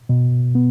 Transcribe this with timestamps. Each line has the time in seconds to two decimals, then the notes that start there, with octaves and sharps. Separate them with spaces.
0.09 B2
0.55 B3